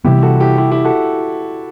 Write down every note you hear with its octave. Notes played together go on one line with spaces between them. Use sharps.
C3 E3 G3 B3 E4 G4
F#4 A4
E4 G4
E4 G4
E4 G4
F#4 A4